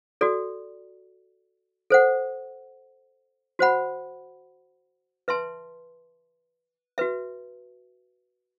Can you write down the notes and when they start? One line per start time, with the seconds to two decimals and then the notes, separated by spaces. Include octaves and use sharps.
0.21 F#4 A4 D5
1.90 A4 C5 F#5
3.59 F#4 C5 F#5 B5
5.28 B4 E5 A5 C6
6.98 F#4 B4 E5